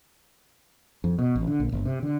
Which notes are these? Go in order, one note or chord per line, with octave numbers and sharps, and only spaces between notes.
F2
B2
A1
D3
A#1
G1
C3
D3